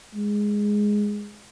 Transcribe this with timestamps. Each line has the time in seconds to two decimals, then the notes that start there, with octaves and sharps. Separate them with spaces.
0.14 G#3